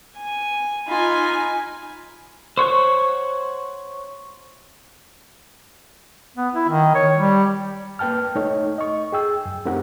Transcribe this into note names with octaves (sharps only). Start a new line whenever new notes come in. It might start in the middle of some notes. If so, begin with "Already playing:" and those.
G#5
D#4 F4 G#5 B5
C5 C#5 F#5 C#6
B3
E4
D#3
C#5
G3
A#3 B4 G5 A5 F6
A3 D#4 A4 C#5
D#5 C#6
G#4 G5 E6
F#2
A3 C4 D#4 G4 A#4 F#5